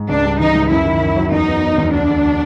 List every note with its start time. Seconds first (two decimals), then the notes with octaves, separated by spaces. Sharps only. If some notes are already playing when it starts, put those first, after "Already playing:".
Already playing: G#2
0.09 C#2 D4
0.25 G3
0.40 E3 D#4
0.55 C#2
0.70 F#2 E4
0.85 D#3
1.01 F#2
1.16 F#3
1.31 E2 D#4
1.47 B3
1.62 B3
1.78 E2
1.93 D2 D4
2.08 D2